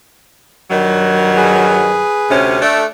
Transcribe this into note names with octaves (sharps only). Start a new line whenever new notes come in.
G2 D#3 F#3
G#4 B4
D2 C3 C#4
A3 D4